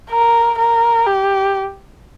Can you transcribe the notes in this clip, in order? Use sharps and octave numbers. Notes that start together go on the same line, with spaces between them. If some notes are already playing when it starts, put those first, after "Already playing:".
A#4
A#4
G4